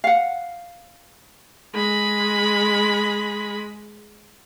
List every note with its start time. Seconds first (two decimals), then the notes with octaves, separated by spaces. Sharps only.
0.04 F5 F#5
1.74 G#3 B5